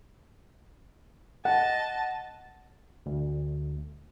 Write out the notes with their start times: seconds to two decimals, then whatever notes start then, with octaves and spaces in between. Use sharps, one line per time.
1.45 D#5 F#5 A5
3.06 D2